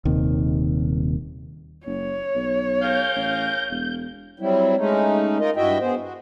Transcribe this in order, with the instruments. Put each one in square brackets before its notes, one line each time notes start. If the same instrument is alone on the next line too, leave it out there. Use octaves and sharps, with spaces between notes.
[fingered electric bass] D#1 D#2 C3 D#3
[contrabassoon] F#1 [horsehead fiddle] C#5
[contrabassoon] B1
[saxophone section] G#4 A#4 F5 [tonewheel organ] G6
[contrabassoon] A1
E1
[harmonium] F#3 G3 C4 E4
G#3 A3 C#4 D#4
D#4 F4 A#4 D#5
G2 E4 F#4 D#5 E5 G5
B3 G#4 C5
F#4